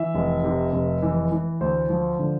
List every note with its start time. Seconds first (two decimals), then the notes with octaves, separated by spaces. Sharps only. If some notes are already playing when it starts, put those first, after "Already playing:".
Already playing: E3 E5
0.15 F1
0.44 C3
0.73 F1
1.02 E3
1.32 E3
1.61 D2 C5
1.90 F3
2.19 D3